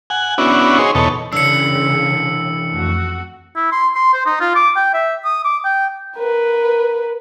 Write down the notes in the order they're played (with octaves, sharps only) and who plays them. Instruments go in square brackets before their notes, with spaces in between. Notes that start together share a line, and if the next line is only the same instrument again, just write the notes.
[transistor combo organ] F#5 G#5
B3 C#4 D4 E4 F#4
D#4 G#4 C5 C#5
E2 B2 D#4 A4 C#5
[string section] C#3 [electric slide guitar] E3 D4 [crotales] E6 C#7
[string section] F2 A3 F#4
[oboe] E4
C6
C6
C5
D#4
F4
D6
G5
E5
D#6
D6
G5
[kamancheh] A#4 B4